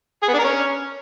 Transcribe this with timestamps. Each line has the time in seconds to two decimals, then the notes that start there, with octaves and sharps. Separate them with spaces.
0.23 G#4
0.28 B3
0.33 D4
0.39 A#4
0.44 C#4